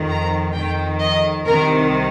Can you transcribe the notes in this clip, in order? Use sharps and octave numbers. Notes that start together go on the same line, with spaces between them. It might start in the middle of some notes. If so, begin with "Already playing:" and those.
Already playing: F2 D#3
A#5
F2 D#3 G5
D#5
C2 C3 D#3 A#4